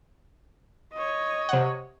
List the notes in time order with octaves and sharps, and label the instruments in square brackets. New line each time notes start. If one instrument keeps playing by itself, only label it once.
[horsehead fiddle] C#5 D#5
[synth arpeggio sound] C3 F#5